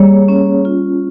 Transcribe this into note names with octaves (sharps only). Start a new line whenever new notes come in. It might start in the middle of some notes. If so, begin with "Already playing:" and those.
Already playing: G3 A#3 G#4 C#5
C#4
F4